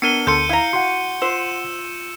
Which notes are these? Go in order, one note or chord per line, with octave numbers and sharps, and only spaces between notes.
B3 D4 A#4 C#7 D#7 G7
D2 A4 C6 G6 C#7
E4 F5 A#5
F#4 F#5 C6
F4 C5 E6 E7